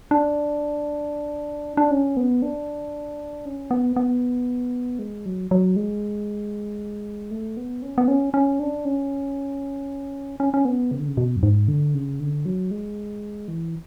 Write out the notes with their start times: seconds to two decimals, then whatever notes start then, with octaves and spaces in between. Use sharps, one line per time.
0.11 D4
1.77 D4
1.91 C#4
2.17 B3
2.42 D4
3.46 C#4
3.71 B3
3.96 B3
4.99 G#3
5.26 F#3
5.51 F#3
5.76 G#3
7.31 A3
7.57 B3
7.82 C#4
7.98 B3
8.08 C#4
8.34 C#4
8.60 D4
8.85 C#4
10.40 C#4
10.54 C#4
10.65 B3
10.91 C#3
11.00 D3
11.08 C#3
11.17 B2
11.36 F#2
11.43 G#2
11.68 D3
11.94 C#3
12.20 D3
12.46 F#3
12.71 G#3
13.48 E3